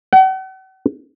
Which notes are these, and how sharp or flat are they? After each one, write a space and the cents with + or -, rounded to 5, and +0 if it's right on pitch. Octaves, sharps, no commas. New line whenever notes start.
F#5 +45